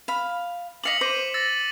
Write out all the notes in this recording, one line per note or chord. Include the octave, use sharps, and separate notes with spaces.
F5 B5
D#5 F5 D6 B6 C#7 F#7
C5 D6 D#7
E6 A6 A#6